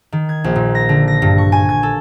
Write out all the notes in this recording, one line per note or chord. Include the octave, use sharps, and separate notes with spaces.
D#3
G#6
A#1
A#2
A#6
D3
A#6
G2
C#6
G#5
G#6
A4